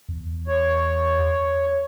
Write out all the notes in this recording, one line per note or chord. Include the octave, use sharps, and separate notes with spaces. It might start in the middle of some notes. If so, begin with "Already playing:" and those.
E2
C#5